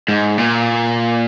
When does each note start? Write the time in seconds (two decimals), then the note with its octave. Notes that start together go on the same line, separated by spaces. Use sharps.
0.08 G#2
0.38 A#2